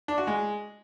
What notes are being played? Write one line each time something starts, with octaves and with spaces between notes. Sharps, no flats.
D4
F#4
G#3